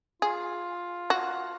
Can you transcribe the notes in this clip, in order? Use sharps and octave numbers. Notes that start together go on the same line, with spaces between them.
F4 G#4
F#4